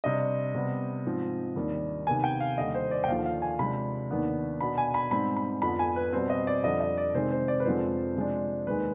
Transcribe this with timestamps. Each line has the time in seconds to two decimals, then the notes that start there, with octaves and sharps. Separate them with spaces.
0.04 C3 G3 D4 D#5
0.55 C3 G3 B3
1.06 G#2 F3 C4
1.56 D#2 D#3 G3 D4
2.07 C3 D#3 B3 G#5
2.24 G5
2.40 F5
2.58 D#2 D3 G3 D#5
2.75 C5
2.91 D5
3.04 G5
3.08 D#2 D3 F3 F5
3.26 F5
3.42 G#5
3.59 C3 F3 G#3 D4 B5
4.10 D#2 D#3 B3 D4
4.60 B2 B3 D4 B5
4.78 G#5
4.94 B5
5.11 G#2 G3 C4 B5
5.37 B5
5.62 F2 D3 F3 B3 B5
5.79 G#5
5.96 B4
6.13 B2 G3 C4 C5
6.30 D#5
6.47 D5
6.64 F2 D3 G3 D4 D#5
6.81 D#5
6.98 D5
7.14 C3 D#3 G#3 C4 C5
7.31 C5
7.48 D5
7.60 B4
7.65 F2 D3 F3 G#3 C4 C5
8.16 C3 F3 G#3 D4
8.67 D#2 D#3 G#3 B4